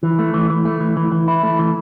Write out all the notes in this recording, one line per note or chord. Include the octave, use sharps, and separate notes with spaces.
E3
A3
E3
E3
A3
E3
E3
E3
E4
A3
E3